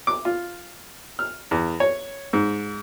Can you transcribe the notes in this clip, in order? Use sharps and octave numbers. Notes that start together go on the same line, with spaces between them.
D6
F4
F6
E2
C#5
G#2